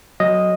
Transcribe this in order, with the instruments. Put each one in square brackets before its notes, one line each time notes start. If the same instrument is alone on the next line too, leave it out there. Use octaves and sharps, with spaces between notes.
[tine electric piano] F#3 D#5